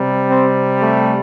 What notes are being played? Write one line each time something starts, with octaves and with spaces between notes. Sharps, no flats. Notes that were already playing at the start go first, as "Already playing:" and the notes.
Already playing: C3 G3
C4
A3